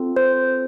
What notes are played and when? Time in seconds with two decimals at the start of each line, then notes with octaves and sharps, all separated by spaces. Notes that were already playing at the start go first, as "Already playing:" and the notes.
Already playing: C4 F4 A4
0.16 C5